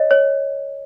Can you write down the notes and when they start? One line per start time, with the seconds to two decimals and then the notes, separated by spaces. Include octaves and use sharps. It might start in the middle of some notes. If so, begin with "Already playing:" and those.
Already playing: C#5 D#5
0.11 C#5